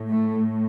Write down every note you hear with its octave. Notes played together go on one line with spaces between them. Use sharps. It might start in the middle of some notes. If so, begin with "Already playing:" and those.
Already playing: A2
A3